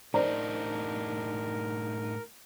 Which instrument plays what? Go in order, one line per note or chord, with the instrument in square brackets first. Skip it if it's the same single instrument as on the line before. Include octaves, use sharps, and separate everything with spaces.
[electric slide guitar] A2 D4 D#4 [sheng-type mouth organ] A#4 [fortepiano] C5 D5 A#5